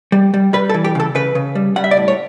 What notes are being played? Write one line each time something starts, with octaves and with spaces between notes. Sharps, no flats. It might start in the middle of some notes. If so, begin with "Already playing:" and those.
G3
G3
G3 B4
A4
E3
G4
C#3 A4
C#3 B4
C#3
G3
G3 F#5
E5
D5
A2
C#5